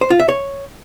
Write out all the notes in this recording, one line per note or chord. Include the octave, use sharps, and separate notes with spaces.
C5
F4
E5
C#5